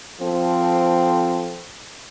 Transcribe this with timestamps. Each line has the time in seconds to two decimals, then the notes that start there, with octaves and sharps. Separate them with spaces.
0.21 F3 C4 A4